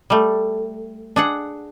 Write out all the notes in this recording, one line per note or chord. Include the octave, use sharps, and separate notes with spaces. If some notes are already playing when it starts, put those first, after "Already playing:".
G3 A3
D4 G#4 F#5